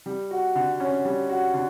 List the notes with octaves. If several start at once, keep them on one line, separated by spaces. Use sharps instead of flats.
G3
F#4
D3
C#4
G3
F#4
D3